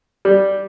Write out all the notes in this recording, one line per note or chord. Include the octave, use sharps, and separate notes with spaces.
G3